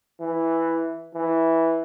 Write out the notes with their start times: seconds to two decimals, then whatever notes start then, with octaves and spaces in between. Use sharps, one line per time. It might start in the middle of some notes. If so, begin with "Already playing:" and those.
0.20 E3
1.14 E3